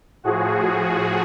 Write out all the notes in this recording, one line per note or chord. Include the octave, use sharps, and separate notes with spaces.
A2 F3 F#4 G#4